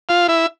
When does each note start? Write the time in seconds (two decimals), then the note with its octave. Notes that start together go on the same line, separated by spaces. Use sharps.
0.09 F4 F5
0.28 E4 E5